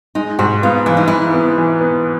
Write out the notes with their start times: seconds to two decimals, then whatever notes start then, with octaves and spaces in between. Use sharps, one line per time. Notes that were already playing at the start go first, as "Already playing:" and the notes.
0.15 G#3 D#4
0.39 G#2 F#4
0.62 B3 F4
0.86 E3 E4
0.97 D#4
1.08 E3 E4
1.34 B3
1.58 E3
1.81 B3